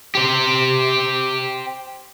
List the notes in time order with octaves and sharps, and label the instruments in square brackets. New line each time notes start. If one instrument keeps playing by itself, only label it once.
[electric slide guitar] G4 C5